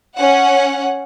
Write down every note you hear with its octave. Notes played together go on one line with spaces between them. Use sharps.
C#4 F#5